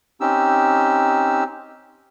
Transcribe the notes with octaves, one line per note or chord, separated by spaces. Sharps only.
C4 C#4 D#4 G4 E6